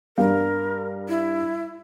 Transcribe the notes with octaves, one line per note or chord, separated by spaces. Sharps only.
G2 A#4 F5
E4